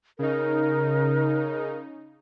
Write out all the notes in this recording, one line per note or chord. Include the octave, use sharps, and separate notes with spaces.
C#3 D#4 A#4